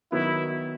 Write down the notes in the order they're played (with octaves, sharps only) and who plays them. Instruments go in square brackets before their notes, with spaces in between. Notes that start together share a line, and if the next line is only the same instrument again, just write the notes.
[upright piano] D#3 F#3 B3 [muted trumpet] E4